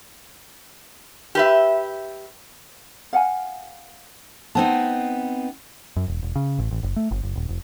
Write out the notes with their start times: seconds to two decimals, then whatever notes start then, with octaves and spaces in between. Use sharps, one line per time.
1.35 G4 B4 E5
3.13 F5 F#5 G#5
4.55 B3 C4 D#4 C5 A5
5.96 F#2
6.08 E1
6.23 E1
6.36 C#3
6.58 A1
6.71 A1
6.83 F#1
6.96 A3
7.11 G1
7.23 F#1
7.36 D#1
7.49 F1